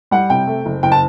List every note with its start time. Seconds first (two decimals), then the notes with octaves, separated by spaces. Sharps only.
0.11 G3 F#5
0.30 C3 G5
0.47 A3
0.66 F#1
0.83 F#1 G5
0.92 A5